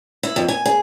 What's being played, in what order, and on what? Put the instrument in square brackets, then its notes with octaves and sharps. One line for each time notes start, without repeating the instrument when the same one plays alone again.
[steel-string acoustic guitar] E4
F2
G#5
G#4